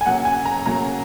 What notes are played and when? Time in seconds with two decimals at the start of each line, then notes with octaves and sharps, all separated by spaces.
0.01 G#5
0.05 C#3 F#3 A#3 F#5
0.25 G#5
0.45 A#5
0.65 C#3 F#3 A#3 A#5